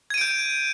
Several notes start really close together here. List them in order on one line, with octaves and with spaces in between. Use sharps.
G#6 D#7 D7 G6